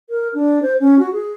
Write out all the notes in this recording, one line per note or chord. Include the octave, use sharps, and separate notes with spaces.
A#4
D4
C5
C#4
F#4
G#4